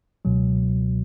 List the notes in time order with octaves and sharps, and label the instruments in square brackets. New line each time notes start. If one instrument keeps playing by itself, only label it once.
[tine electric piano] C#2 B2 F#3